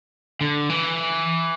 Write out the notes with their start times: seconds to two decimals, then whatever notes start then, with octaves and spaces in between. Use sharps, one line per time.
0.41 D3
0.69 E3